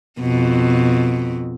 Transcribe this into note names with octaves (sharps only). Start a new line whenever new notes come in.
F2 B2